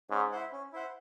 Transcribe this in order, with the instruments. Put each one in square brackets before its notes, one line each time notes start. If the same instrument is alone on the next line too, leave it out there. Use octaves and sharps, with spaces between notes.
[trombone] G#2 [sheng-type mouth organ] C#4
[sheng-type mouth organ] E4 C5 F#5
C#4
E4 C5 F#5